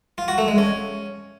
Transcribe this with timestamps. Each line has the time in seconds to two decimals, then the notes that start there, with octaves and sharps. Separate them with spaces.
0.18 F4
0.28 F#4
0.38 A3
0.48 G#3
0.58 C#4